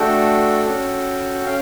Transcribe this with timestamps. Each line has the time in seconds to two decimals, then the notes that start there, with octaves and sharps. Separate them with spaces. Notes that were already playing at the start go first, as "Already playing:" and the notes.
Already playing: A3 D4 F#4 A4 G5
0.65 C#4 F#4 A4
1.46 C#4 F5